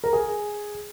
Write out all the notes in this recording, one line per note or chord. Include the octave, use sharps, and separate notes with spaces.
A#4
G#4